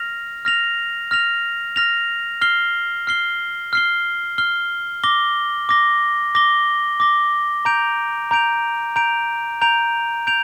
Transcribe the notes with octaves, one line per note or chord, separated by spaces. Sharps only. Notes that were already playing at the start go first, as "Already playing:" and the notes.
Already playing: F6 A#6 F7
F6 A#6 F7
F6 A#6 F7
F6 A#6 F7
F6 C7 G7
F6 C7 G7
F6 C7 G7
F6 C7 G7
D6 A#6 G7
D6 A#6 G7
D6 A#6 G7
D6 A#6 G7
A#5 G6 D7 F7
A#5 G6 D7 F7
A#5 G6 D7 F7
A#5 G6 D7 F7
G6 D7 F7